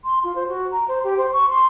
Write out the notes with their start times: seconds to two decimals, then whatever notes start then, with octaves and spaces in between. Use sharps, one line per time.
0.05 C6
0.24 F4
0.35 C5
0.48 F#4
0.72 A#5
0.88 C5
1.04 G4
1.18 C5
1.33 C#6
1.49 C6